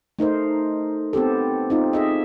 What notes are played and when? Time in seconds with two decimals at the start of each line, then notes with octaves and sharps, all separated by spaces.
0.19 A3 D#4 A#4 C5
1.13 B3 C4 G4 A4
1.70 C4 D#4 F4
1.93 G#4 D#5 E5